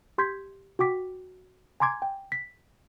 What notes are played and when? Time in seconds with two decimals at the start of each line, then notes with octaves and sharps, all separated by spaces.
0.18 G4 C6 G6 G#6 B6
0.79 F#4 G5 D6 B6
1.80 G#5 A#5 C6 D6 G#6
2.02 G5
2.32 B6